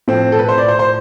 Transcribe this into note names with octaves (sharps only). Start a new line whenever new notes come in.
A2 F3 C4
A4
B4
C5
D5
C5
C5